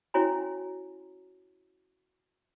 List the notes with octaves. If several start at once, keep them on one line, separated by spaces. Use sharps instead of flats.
C#4 E4 F#4 C#5 G#5 A#5